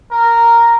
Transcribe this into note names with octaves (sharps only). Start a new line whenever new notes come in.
A#4